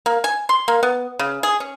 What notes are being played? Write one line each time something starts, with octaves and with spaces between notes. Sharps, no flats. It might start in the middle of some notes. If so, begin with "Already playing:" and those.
A#3
G#5
C6
A#3
B3
C#3
G#4
C#4